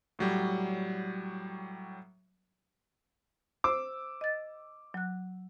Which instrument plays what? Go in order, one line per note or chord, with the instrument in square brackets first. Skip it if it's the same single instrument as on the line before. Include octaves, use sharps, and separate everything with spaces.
[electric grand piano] A2 F#3 G3
[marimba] C5 [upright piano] D6 E6
[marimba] D#5 A6
F#3 F#6